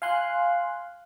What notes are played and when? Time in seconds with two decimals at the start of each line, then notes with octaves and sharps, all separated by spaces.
0.02 F5 G#5 C6 F#6